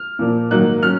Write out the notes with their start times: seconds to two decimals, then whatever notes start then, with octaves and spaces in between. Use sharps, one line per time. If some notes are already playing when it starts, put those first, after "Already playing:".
Already playing: F6
0.19 A#2 F3 A#3
0.51 G#2 D#3 F#3 A#3 D#4 F#6
0.83 F#3 C#4 F6